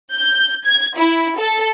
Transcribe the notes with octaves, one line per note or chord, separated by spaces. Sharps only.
G6
G#6
E4
A4